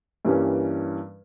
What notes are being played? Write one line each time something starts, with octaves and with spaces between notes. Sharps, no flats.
G2 E3 G3 A#3 C#4